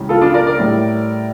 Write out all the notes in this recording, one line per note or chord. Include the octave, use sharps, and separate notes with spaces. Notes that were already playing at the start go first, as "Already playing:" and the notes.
Already playing: C#2 C#3 E3 G3
F4 A4
D4 F4
A#4 D5
A#4 D5
A2 G3